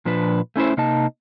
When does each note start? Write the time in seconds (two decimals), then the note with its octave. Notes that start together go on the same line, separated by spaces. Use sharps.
0.05 A#2 F3 D4 B4
0.56 A3 C#4 E4 C5
0.77 C3 A#3 D#4 D#5 A5